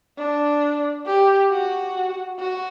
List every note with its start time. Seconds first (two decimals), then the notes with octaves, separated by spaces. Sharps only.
0.18 D4
1.06 G4
1.51 F#4
2.39 F#4